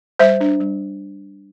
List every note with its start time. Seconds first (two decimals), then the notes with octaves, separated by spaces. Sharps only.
0.19 G3 C5 E5
0.40 D4
0.60 G3